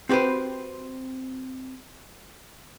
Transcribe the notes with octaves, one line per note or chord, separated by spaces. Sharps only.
C4 F#4 G4 B4 C5